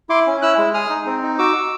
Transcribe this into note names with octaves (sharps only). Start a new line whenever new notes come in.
E4 C6 D6
C#4
E4 E6 F#6
G#3
G#4 D#6 F6
D#4
C4
D#4
F#4 D6 E6
F#4